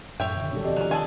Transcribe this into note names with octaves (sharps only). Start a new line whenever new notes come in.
F#2 A2 C#5 E5 G5
B2 D3 D#3
B1 A#2 G3 D4 G4 A4
D#2 C3 E3 C4 G4 D5 D#5
D#3 F3 F#3 C#4
G#4 A4 G#5